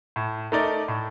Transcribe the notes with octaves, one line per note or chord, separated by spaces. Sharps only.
A2
A3 D#4 A#4 D5
A2